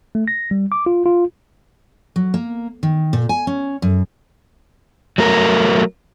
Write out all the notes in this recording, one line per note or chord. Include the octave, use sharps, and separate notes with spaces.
A3
A#6
G3
D6
F4
F4
F#3
A#3
D#3
A#2
G#5
C#4
F#2
F#3 A3 A#4